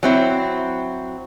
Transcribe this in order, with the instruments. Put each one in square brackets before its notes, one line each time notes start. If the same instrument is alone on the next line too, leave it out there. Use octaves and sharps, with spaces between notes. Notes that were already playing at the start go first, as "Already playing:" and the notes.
[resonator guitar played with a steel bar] F#3 C4 E4